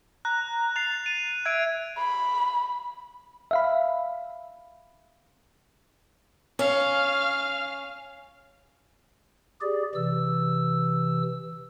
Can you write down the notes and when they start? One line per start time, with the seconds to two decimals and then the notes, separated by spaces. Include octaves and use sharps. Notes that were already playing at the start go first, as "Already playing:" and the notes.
0.25 A#5 F#6
0.76 A6 C7 F7
1.06 D#7
1.46 E5 G#6 D7
1.97 B5
3.51 E5 F5 B5
6.59 C#4 F5
9.61 G4 G#4 D5
9.95 C3 E3 E6